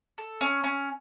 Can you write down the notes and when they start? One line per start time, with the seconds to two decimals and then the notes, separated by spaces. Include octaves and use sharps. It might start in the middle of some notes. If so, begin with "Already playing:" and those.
0.18 A4
0.41 C#4
0.64 C#4